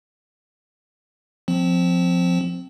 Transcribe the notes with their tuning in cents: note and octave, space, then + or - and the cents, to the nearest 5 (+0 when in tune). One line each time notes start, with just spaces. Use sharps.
F3 +15 C4 -5